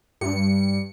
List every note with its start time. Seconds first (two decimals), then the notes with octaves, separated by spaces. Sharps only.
0.21 G2 C#7